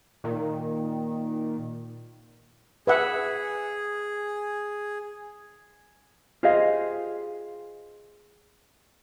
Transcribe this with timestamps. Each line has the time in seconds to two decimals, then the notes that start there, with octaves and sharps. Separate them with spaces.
0.24 A#2 D#3
2.87 G#4 B4 E5 F#5
6.43 F4 G4 G#4 C5 D#5 F5